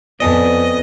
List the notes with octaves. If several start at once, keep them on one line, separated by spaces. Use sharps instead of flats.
F2 B3 D5 D#5 G#5 A5